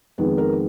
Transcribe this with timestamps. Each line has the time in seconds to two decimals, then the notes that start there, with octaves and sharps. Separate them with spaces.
0.18 F2 D#3 G#3 B3
0.38 A#4